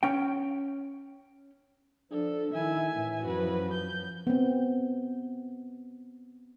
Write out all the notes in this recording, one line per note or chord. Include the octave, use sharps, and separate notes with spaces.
C#4 G5
F3 D4 A4
D#3 E4 E5 G#5
A2 E3
F#2 F3 F#4 B4
G6
B3 C4